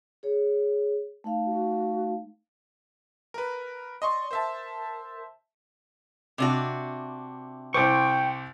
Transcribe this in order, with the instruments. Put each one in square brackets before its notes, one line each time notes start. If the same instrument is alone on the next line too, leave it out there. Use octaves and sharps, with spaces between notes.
[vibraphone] G#4 C#5
A3 D#4 F5
[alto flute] F#4
[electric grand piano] A#4 B4
[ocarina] D5 [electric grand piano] D#5 C6 C#6
[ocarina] A#4 [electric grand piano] C5 E5 A5
[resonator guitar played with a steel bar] C3 D4 F#4
[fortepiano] C2 C5 [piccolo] G5 [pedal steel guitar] C#6 D6